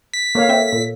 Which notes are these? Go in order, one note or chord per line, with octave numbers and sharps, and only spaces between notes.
B6
A#3 A4 C#5 F5
C4 E5 G5
A#2